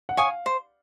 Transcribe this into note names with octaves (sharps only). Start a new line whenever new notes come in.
F#5
C#5 F5 G#5 D#6
C5